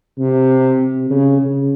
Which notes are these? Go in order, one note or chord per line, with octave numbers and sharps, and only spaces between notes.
C3
C3
C#3
C#3